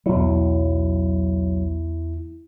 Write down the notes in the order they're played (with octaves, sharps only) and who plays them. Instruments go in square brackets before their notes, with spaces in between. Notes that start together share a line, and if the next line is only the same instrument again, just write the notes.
[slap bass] B1 F#3 [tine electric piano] E2 E4